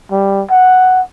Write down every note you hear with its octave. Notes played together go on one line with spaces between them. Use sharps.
G3
F#5